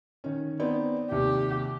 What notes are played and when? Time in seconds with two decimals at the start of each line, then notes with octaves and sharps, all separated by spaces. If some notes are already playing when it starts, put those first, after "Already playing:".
0.24 D#3 C#4
0.60 B3 C4 D#4 D5
1.11 D#2 C3 G4